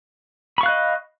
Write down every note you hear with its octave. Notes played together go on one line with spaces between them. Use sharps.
D#5 F5 B5 C#6 F#6